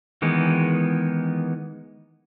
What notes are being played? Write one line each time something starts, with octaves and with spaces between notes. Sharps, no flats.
D#3 E3 G#3 B3